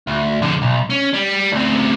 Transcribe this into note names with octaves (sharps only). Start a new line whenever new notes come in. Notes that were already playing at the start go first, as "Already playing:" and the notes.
D2
F2 D3
B1
C#4
G3
D2 C3